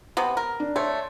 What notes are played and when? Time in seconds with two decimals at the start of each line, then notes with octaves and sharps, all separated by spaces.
0.17 C3 B3
0.37 A#4
0.60 D4
0.76 A3 C#5 D5 C6